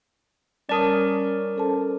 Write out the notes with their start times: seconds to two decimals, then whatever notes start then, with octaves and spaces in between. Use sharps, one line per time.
0.69 G3 C#4 A#4 D5 A5 D#6
1.56 C#4 A4 C5 A5